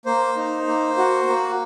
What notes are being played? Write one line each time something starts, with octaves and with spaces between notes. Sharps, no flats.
A#3 C5
D#4
A#3
F#4
A#3